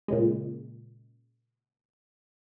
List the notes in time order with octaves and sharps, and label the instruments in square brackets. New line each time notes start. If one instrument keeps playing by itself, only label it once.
[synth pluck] A#2 C#3 G#3